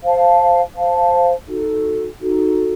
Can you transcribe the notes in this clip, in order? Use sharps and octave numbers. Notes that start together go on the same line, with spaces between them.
C5 F5 A5
C5 F5 A5
D#4 F#4 A4
D#4 F#4 A4